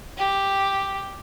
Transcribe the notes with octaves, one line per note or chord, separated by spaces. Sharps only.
G4